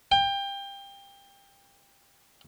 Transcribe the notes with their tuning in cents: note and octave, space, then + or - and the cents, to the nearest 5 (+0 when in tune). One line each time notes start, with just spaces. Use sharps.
G5 +25